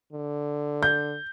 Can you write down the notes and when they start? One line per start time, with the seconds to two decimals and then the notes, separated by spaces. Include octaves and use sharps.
0.13 D3
0.83 G6